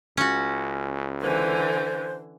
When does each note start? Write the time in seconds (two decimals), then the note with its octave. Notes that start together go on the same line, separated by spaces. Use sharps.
0.17 C#2 C#4 F#4
1.22 D3 E3 C5